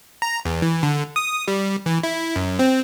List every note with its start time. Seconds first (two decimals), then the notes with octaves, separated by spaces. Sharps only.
0.22 A#5
0.45 E2
0.62 E3
0.83 D3
1.16 D#6
1.48 G3
1.86 E3
2.03 E4
2.36 F#2
2.59 C4